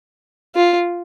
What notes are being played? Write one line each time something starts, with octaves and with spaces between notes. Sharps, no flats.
F4